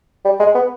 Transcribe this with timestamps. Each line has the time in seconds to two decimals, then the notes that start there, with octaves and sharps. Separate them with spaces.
0.25 G3
0.40 G#3
0.55 B3